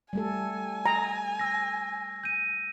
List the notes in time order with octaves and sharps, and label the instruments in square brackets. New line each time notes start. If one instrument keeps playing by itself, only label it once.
[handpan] G3 A3 A4 [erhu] G#5
[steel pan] A#5
[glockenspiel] E6 A#6
G6 D#7